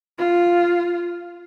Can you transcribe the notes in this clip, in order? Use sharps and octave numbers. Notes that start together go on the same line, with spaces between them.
F4